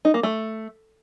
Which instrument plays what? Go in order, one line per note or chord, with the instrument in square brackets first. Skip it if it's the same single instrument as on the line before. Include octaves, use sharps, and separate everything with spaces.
[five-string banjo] D#4
A#3
A3